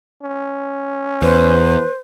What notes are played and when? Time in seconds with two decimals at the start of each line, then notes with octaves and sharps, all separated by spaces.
0.23 C#4
1.22 E2 B4 C5